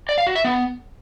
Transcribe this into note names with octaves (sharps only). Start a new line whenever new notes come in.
D5
F5
F#4
E5
B3